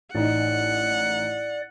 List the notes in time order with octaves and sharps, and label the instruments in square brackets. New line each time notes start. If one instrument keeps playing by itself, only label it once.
[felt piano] A1 D#4 [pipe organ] D5 [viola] F#5